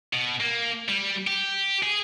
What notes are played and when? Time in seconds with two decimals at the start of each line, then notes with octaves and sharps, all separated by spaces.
0.13 B2
0.40 A#3
0.88 G3
1.27 G4
1.82 G#4